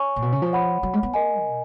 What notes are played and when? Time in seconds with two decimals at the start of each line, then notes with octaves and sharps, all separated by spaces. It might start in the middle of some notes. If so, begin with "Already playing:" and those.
Already playing: C#5 G#5 C#6
0.16 A#2
0.22 B2
0.32 C#3
0.42 F3
0.53 C#5 F#5 B5
0.83 F#3
0.93 G#3
1.03 B3
1.14 A#3 A#4 D#5 G#5
1.44 B2